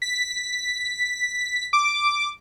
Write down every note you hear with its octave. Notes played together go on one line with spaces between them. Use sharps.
B6
D6